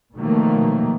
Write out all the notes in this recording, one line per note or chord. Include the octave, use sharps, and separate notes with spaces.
B2 D#3 F3 F#3 A3 A#3